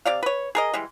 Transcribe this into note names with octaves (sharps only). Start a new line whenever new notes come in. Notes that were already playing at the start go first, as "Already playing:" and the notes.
C3 D5 F5
B4 C#5
G#4 A#4 D#5
E3 G3 G#3